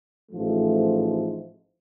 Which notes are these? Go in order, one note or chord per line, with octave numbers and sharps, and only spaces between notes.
A1 G#2 F3 A3